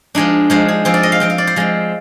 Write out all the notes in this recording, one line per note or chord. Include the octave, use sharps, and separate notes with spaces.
F3 G#3 D4 D#4
F3 G#3 D4 C5
G#4
F3 C4 G#4
D5
D#5
F5
F3 C4 G5
F5
D5
C5
F3 G#3 C4